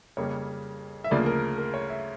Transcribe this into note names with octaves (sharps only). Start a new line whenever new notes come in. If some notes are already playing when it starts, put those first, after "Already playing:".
F2 C#3 G3 A#3 C#5
E5
D2 C#3 F3 A#3 D5
A#4
A#4
C#5
E5